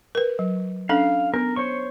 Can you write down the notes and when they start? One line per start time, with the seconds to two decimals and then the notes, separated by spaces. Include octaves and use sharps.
0.15 A#4 B4
0.39 F#3
0.89 C#4 D4 A4 F5
1.34 B3 A#4
1.56 C5 C#5 C#6